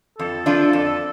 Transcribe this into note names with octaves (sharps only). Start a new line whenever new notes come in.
F2 A4
F3 D4 F4
F2